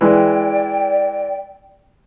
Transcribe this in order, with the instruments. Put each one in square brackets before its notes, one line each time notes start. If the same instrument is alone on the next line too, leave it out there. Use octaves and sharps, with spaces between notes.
[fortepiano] E3 G#3 [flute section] D5 G5